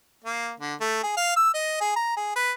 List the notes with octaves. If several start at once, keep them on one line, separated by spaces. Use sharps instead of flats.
A#3
D3
A3
G#4
F5
E6
D#5
G#4
A#5
G#4
B4